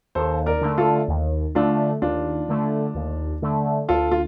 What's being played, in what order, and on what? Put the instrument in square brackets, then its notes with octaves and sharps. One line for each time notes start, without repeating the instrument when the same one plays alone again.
[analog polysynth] D#2 [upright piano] A4 C5
[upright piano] A#4 D5
[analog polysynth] D3 A3
[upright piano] F4 A4
[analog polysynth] D#2
[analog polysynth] D3 A3 [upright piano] D4 F4
[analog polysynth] D#2 [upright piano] D4 F4
[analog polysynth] D3 A3
D#2
D3 A3
[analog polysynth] D2 [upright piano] F4 A4
[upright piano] F4